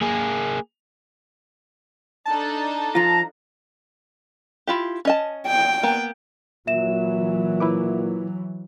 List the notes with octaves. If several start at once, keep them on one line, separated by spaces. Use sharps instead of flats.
A#3 G#4
D4 D#4 A4 A5
F3 F4 A#5
E4 F4 G4
C#4 D#5 A5
G5
A#3 B3
A#2 E3 F#3 E5 E7
E4 B4 D6